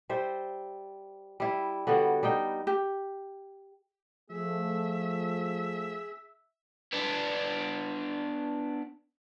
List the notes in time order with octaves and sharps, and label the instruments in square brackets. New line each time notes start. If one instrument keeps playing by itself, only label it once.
[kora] G3 C5 E5
G3 E4
D3 G3 B3 F#4
G3 D#4 G5
[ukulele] G4
[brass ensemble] F3 A3 [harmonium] G#4 [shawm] E5
[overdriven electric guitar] B3 D4